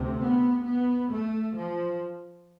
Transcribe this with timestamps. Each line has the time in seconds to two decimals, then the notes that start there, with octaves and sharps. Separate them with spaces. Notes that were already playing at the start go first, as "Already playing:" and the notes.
Already playing: D2 C3
0.20 B3
0.65 B3
1.11 A3
1.56 F3